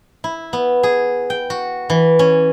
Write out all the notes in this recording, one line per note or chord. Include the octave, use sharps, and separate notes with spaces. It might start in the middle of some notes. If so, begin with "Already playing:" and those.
E4
B3
G#4
G5
F#4
E3
C#4